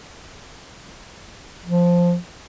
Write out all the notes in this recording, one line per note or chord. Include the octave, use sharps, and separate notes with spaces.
F3